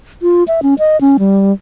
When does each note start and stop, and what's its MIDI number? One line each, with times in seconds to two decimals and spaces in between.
0.22 0.44 65
0.48 0.60 76
0.63 0.74 61
0.79 0.99 75
1.01 1.17 61
1.19 1.53 55